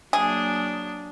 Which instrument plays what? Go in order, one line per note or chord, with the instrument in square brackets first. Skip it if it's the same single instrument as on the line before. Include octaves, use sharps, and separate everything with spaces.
[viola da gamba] F#3 A#3 D4 [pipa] G#4